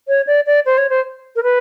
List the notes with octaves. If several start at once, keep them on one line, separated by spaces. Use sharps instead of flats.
C#5
D5
D5
C5
C#5
C5
A#4
B4